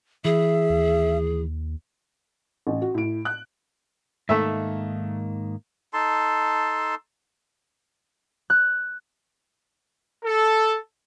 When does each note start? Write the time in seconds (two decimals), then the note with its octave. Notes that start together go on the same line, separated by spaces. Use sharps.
0.25 E3 G#4 E5
0.70 D#2
2.67 A1
2.82 F#4
2.94 A2 D7
3.25 F#6
4.29 G#2 D#3 A3 A#3 E5
5.93 D#4 A4 A5 C6
8.50 F#6
10.25 A4